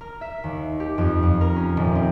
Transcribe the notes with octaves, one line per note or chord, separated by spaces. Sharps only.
A#4
E5
D#2
G4
F2
F2
A#4
C#4
D#1
C4